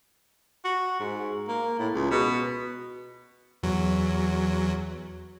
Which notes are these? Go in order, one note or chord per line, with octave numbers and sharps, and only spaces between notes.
F#4
G#2
A#3
A2
C#2
B2
E2 F#3